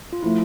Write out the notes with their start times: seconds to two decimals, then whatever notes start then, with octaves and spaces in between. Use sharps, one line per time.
0.13 F4
0.23 F3 A3 E4